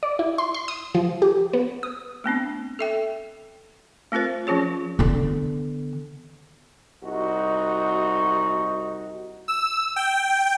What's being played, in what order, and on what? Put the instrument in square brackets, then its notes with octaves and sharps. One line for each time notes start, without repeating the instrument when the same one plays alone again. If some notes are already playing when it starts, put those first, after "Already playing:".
[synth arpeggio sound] D5
E4
C6
C6
D#6
F3
G4
B3
D#6
[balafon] A3 B3 C4 D4
A4 E5 G5
A3 C4 F4 A#4 C5
F3 C#4 F4 G#4 C#5
[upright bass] D3 B3
[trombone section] C2 D#4 F#4
[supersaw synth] E6
G5